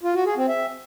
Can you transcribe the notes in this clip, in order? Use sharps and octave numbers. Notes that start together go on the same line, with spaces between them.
F4
F#4
G#4
C4
E5